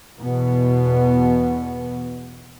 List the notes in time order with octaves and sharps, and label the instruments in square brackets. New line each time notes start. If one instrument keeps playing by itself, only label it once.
[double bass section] E2 B2 B3